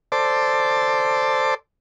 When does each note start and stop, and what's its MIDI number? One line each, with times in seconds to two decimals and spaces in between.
0.12 1.54 69
0.12 1.54 72
0.12 1.54 74